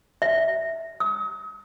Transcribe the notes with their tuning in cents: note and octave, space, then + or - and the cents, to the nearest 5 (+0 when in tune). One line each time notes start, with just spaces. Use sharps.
E5 -10
D#6 +35